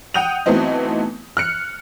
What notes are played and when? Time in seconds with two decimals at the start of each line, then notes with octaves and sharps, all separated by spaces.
0.14 F#5 G5 D#6 G6 D#7 F7
0.46 E3 F#3 A3 B3 C4 D#4
1.37 F6 F#6 C#7